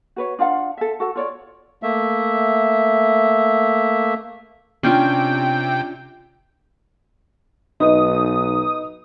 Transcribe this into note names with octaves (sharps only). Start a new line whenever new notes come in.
F#4 B4 C#5
D4 F4 F5 F#5
A4 E5
F#4 A4 F#5
F4 C#5 D5
A3 A#3 E5
C3 C#4 D4 F4 G5
B1 D#4 B4 D#5 D#6